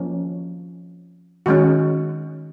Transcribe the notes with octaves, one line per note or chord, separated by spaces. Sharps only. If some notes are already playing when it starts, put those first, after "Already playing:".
Already playing: F3 A#3 C#4
D#3 G#3 C#4 F#4